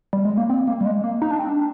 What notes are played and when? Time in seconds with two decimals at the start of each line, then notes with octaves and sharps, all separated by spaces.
0.13 G3
0.25 G#3
0.37 A#3
0.49 C4
0.67 A#3
0.81 G3
0.86 G#3
1.04 A#3
1.22 D#4
1.31 D4
1.39 C4
1.49 D4